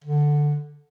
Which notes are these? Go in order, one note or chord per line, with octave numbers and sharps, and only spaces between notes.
D3